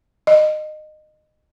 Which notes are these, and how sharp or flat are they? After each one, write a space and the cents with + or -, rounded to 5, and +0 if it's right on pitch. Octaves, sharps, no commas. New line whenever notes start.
D#5 -20